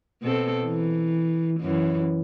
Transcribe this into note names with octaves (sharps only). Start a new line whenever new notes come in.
B2 C4 A4
E3
F#2 E3